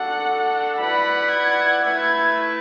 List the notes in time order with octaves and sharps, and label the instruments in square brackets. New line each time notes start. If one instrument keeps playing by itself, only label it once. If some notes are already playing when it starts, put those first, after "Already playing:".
Already playing: [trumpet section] D4 F#4 A4 [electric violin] F#5
[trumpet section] E4 B4 D5 F#5 [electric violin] B5
[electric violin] G#6
[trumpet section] A3 E4 B4 E5 [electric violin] G#6